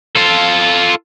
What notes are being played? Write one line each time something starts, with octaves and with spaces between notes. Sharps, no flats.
F4 A4